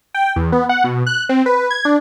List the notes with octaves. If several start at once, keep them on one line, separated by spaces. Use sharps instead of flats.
G5
E2
B3
F#5
B2
F#6
C4
B4
G#6
D4